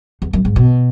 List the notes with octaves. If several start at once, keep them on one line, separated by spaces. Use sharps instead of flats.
E2
F#2
G#2
B2